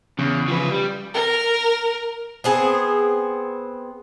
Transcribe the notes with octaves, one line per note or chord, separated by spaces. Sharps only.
E2 C#3
F3 B4
G3
A#4
B3 C4 G#4